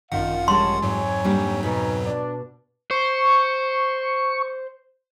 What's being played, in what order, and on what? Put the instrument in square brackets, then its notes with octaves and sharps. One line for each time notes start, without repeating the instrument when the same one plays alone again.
[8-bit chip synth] G#1 F#2 F#5 [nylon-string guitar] D#3 [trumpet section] F4 F5
[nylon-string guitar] G3 G#3 F4 [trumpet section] C#5 A5 [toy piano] C6
[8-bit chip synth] F2 G#2 F#3 [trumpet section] C#5 G#5
[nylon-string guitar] G3 A#3 D4
[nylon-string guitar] B2 F#4 B4 [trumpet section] D#4 G#5 A#5
[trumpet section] D4
[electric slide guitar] C5 [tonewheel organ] C#6